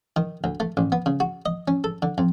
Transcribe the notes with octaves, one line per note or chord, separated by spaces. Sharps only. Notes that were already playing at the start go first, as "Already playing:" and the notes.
D#3
D2
A3
A1
B3
C#3
F#4
D#5
C#4
A4
D3
F2